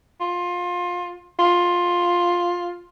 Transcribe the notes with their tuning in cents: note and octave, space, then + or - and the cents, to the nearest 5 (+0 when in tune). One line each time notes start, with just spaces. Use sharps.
F4 +20
F4 +10